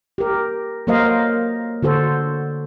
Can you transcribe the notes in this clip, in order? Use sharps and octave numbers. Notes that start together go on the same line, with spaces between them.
G4 A#4
F#3 A#3 A#4 C5 D#5 F5
D3 F#4 A4 C5